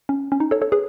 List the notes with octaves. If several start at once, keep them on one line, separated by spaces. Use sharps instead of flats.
C#4
C#4
D#4
A4 C#5
A4 C#5
G#4 B4